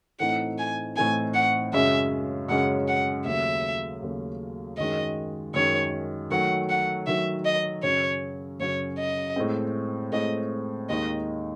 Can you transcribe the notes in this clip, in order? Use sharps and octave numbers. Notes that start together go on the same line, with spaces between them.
A2 E3 A3 C4 D#4 F#5
G#5
A2 E3 A3 C4 D#4 G#5
F#5
F#2 C#3 G#3 C#4 E5
F#2 C#3 G#3 C#4 F#5
F#5
D#2 C#3 F#3 A3 E5
D#2 C#3 F#3 A3
F#2 D#3 G#3 D#5
F#2 D#3 G#3 C#5
D#3 F#3 A3 F#5
F#5
D#3 F#3 A3 E5
D#5
F#2 C#3 F#3 C#4 C#5
F#2 C#3 F#3 C#4 C#5
D#5
A2 G#3 C4
A2 G#3 C4 D#5
D#2 D#3 G#3 D#4 D#5